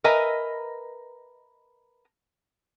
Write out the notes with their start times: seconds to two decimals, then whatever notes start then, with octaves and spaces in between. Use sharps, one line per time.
0.04 A#4 B4 D#5 E5 G#5 A#5